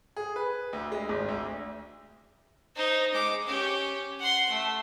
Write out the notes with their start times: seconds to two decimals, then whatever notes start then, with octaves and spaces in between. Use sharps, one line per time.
0.16 G#4
0.36 B4
0.73 D2
0.92 G#3
1.09 G#1
1.28 D2
2.76 D#4 C5
3.14 G#3 D6
3.45 C#4 G4
4.20 F#5 C6
4.49 A3